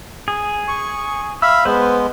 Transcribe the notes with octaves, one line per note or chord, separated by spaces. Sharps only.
G#4
C#6
E5 F5 B5 E6
G#3 B3 B4 C5